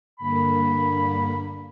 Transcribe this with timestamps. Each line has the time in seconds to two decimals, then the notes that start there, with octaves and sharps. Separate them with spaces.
0.19 G2 D3 A#3 B5